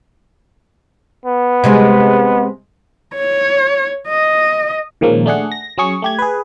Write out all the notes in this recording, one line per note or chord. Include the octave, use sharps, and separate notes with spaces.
B3
C3 G#3 G#4
C#5
D#5
A#2 D#3 F3 G#3 A#3 C#4
A3 D4 G#4 F#5
A#6
F#3 C#4 G#4 C#6
A3 G4 G#6
G#4 B4